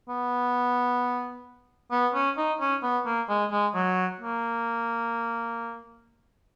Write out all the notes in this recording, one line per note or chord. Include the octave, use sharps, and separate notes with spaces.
B3
B3
C#4
D#4
C#4
B3
A#3
G#3
G#3
F#3
A#3